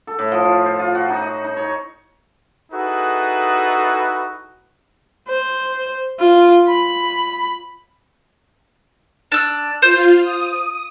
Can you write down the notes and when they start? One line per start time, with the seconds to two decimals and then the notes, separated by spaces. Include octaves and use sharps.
0.07 A4
0.19 A2
0.32 F3
0.45 F4
0.66 C5
0.79 F4
0.95 F#4
1.10 D#4
1.22 D#5
1.44 D#4
1.57 C#5
2.72 D#4 E4 F#4 G#4 A4 B4
5.29 C5
6.19 F4
6.68 B5
9.32 D4 E6
9.82 F4 C5 F5
10.20 D#6